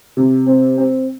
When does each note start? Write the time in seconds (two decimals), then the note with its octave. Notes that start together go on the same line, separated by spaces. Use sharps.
0.17 C3
0.46 C4
0.78 C4